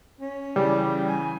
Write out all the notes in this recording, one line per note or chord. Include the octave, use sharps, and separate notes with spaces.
C#4
C#3 E3 G3
G#5